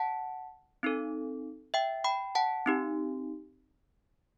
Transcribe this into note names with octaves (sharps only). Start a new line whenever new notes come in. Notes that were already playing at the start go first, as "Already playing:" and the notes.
Already playing: F#5 A5
C4 D#4 A4
E5 G5
G5 B5
F#5 A5
C4 D#4 G4